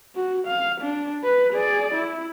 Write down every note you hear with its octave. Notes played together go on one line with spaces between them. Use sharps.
F#4
F5
D4
B4
G#4 D5
E4